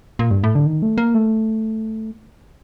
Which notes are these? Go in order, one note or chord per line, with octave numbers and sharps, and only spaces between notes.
A#2
G2
A2
D3
D#3
A3
A#3
A3